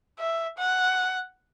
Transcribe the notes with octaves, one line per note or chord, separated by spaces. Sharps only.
E5
F#5